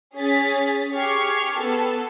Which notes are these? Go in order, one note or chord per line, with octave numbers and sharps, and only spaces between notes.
C#4 G#4 A6 B6
G4 G#4 C#6 F6 G#6 C7
B3 A4 A5